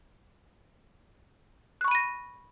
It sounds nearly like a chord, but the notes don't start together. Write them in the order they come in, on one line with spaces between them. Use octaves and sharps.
F#6 C#6 B5 D#7 A#6